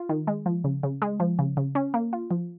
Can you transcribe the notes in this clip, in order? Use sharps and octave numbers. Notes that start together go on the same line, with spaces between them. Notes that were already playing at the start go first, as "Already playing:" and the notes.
Already playing: F4
D#3
G#3
F3
C#3
C#3
G#3
F3
C#3
C#3
C#4
A#3
F4
F3